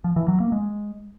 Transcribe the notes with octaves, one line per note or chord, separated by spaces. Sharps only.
F3
E3
F#3
A#3
G#3